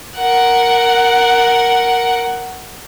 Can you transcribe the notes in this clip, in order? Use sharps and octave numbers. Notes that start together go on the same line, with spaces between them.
A#4 F#5